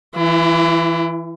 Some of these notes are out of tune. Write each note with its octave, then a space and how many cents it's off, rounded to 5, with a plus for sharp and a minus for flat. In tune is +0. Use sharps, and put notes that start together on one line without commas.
E3 +0 E4 +40